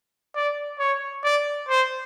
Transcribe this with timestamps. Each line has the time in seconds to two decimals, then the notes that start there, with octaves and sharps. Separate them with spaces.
0.35 D5
0.79 C#5
1.24 D5
1.69 C5